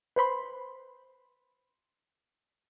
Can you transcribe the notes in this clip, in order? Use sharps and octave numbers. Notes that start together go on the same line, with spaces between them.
B4 C5 B5 C6